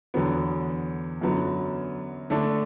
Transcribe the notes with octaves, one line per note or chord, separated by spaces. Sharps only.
E2 D3 F#3 B3
F#2 D3 F#3 B3
D3 A3 D4